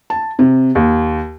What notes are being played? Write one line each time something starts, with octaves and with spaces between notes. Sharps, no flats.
A5
C3
D#2